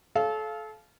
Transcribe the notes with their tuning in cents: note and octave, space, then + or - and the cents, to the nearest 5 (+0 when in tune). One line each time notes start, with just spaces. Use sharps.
A4 -30 C#5 +0 F5 -15